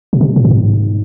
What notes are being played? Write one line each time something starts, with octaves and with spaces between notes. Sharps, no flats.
B2
C3
A#2
A2
G#2